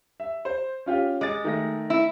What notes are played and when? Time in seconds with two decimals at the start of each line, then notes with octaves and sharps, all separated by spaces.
0.20 E5
0.45 C5
0.86 C#4 F4 G4
1.21 G#3 D6 A6
1.44 D#3 A3 A#6
1.90 E4